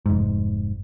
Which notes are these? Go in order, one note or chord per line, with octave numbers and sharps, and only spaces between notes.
F1 G#2